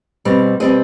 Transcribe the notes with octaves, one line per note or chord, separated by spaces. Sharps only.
B2 G3 C4
B2 G3 C4 D#5